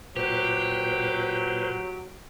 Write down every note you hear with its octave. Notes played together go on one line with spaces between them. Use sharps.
A#2 F#3 G4 B4 C5